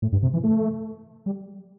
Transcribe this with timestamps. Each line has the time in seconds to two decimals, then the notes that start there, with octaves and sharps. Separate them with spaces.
0.02 A2
0.12 G2
0.23 C3
0.33 E3
0.44 A3
1.26 G3